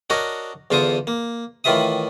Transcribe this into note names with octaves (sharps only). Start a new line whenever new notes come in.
D4 F#4 A#4 C#5 D#5
E2 D3 F4 C5 C#6 D#6
A#3
A2 D#3 E3 F4 E5 D#6